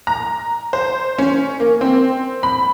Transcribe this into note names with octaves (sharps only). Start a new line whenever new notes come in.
A#5
C5
C#4
A#3
C4
B5